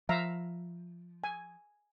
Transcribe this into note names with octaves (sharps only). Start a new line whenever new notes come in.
F3 E5 F5 A#5
G#5